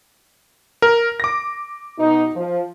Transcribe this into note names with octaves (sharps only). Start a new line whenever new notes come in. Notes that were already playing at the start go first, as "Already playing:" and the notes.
A#4
D6 A#6
B2 D#4
F3